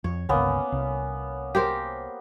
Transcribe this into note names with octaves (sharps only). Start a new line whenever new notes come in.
F2 C#5
G1 C#2 A#3 B3 C#4
C2
G4 A#4 C5